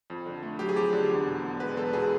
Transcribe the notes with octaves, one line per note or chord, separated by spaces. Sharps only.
F2
D3
A3
F#3 G4
G#4
F2 G4
D3
E2
B2
B3
G#3 B4
E2 A4
B2 G#4